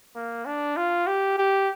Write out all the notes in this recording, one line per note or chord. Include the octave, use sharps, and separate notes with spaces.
A#3
D4
F4
G4
G4